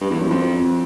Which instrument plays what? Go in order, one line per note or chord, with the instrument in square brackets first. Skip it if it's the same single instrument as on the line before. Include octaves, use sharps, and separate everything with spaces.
[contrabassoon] G2
E2
F#2
F2